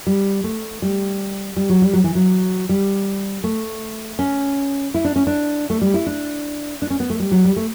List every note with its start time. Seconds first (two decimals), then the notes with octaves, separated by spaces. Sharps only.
0.07 G3
0.44 A3
0.82 G3
1.57 G3
1.69 F#3
1.82 G3
1.93 F#3
2.04 E3
2.15 F#3
2.69 G3
3.44 A3
4.19 C#4
4.94 E4
5.05 D4
5.16 C#4
5.27 D4
5.70 A3
5.81 G3
5.94 E4
6.06 D4
6.82 D4
6.90 C#4
7.00 B3
7.10 A3
7.20 G3
7.31 F#3
7.45 G3
7.57 A3